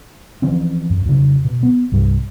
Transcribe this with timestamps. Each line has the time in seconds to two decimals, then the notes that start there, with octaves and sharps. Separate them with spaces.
0.42 E3 F3 C4 C#4
0.90 F#2
1.05 F2 C#3
1.45 B2
1.63 B3
1.92 C2 G2 G3